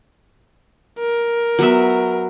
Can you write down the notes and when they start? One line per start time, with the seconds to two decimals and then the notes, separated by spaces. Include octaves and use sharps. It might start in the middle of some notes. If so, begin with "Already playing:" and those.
0.99 A#4
1.59 F#3 B3 E5